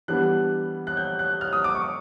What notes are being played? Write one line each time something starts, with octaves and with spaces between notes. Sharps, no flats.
E3 G3 B3 D4 F#6
F#6
G6
F#6
F6
D#6
D6
C#6